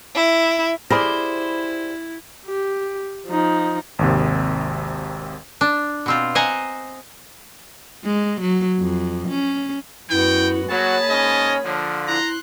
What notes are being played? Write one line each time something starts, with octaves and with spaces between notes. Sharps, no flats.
E4
E4 G4 G#4 C5 D5 B5 F6 A#6
G4
F3 D#4
G#1 D#2 C3
D4
B2 C4 F4
C5 D#5 F#5 G#5 A#5
G#3
F#3
F2
C#4
F#2 B3 E4 F#4 G5
F#3 A#3 F#4 G#4 C#5 A5 B5
G#2 C#4 D#5
D3 F3 A#4
E4 A#5 C6 F#6